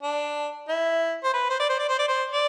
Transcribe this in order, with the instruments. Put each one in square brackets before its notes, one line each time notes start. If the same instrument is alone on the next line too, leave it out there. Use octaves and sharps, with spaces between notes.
[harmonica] D4
E4
C5
B4
C5
D5
C5
D5
C5
D5
C5
D5